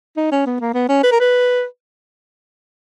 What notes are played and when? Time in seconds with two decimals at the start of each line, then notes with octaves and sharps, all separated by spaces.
0.17 D#4
0.32 C#4
0.46 B3
0.61 A#3
0.74 B3
0.89 C#4
1.03 B4
1.12 A#4
1.20 B4